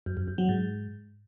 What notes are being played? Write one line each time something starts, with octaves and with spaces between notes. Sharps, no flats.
F#2
F#2
F#2
F#3
G#2